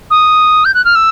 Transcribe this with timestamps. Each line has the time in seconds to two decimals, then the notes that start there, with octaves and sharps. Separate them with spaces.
0.10 D#6
0.65 G6
0.74 F#6
0.84 F6
0.95 E6